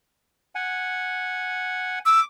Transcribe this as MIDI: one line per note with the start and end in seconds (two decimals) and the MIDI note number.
0.55 1.99 78
0.55 1.99 80
2.06 2.25 86
2.06 2.20 88